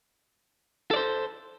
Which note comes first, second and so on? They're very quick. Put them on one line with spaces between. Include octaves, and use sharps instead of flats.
A4 D5 C5